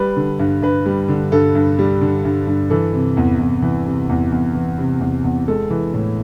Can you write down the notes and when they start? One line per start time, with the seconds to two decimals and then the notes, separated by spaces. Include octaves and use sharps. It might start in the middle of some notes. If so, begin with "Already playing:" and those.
Already playing: G3 B4
0.16 D3
0.39 G2
0.62 G2 B4
0.86 G3
1.08 D3
1.32 G2 A4
1.55 G2
1.79 G3
2.01 D3
2.25 G2
2.47 G2
2.70 E3 A4
2.93 C3
3.17 E2
3.39 E2
3.62 E3
3.86 C3
4.10 E2
4.32 E2
4.55 E3
4.78 C3
5.01 E2
5.24 E2
5.48 G#3 A4
5.70 E3
5.94 A2